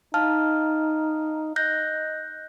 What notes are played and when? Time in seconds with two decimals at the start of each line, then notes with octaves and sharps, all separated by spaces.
0.14 D#4 F5 A5 F6
1.56 D#5 F#6 G6 A#6